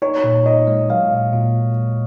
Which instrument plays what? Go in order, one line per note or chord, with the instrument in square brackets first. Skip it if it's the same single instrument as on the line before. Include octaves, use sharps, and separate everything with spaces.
[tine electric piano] D#4 [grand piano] C#5
[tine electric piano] A#2
[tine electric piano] D#4 [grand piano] D#5
[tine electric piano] G#3
[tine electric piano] F#3 [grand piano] F5
[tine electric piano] A#2
A#2